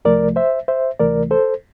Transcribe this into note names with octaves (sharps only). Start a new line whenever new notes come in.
C2 C3 F3 A3 A#4 D5
C5 E5
C5 E5
D2 C3 E3 A3 A#4 D5
A4 C5